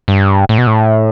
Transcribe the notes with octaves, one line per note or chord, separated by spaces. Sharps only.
G2
A2
B2
A2